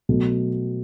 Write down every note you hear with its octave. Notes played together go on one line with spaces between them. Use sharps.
B2 F#3 A3